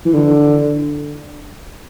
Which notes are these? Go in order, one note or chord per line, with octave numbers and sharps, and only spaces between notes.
E3
D3